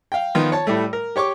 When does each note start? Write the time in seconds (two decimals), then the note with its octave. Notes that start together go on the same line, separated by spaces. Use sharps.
0.12 F5 G5
0.35 D#3 F3 B3 F4
0.52 C#5 A5
0.67 A2 G3 A3
0.93 A#4
1.16 G4 C#5 C#6 D6